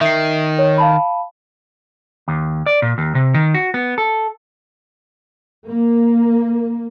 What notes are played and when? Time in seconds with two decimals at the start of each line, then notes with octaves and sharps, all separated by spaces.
0.01 D#3 E5 C7
0.59 C#5
0.78 F5 A5 B5
2.28 D#2
2.66 D5
2.82 A#2
2.98 D#2
3.15 C3
3.34 D#3
3.54 F#4
3.74 B3
3.98 A4
5.67 A#3